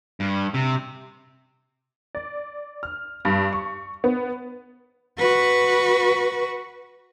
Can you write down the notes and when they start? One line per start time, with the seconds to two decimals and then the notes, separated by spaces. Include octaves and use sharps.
0.20 G2
0.54 C3
2.15 D5
2.83 F6
3.25 G2
3.53 C#6
4.04 B3
5.18 F#4 B4